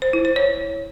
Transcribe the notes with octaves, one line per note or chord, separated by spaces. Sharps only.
C5
E4
C5
C#5